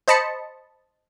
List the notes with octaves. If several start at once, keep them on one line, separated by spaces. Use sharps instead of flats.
C5 D#5 A5 B5 C#7